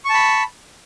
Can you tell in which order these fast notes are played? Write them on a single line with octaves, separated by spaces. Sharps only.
C#6 A5 B5